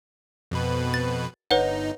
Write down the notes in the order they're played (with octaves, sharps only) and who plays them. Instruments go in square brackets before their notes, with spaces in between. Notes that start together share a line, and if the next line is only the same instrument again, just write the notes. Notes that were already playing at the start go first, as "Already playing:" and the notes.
[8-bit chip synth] F2 B2 B4
[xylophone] A6
[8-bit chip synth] G1 D#4 [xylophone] B4 C#5 F#5